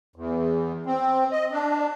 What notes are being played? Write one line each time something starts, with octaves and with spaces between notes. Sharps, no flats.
E2
C4
D#5
D4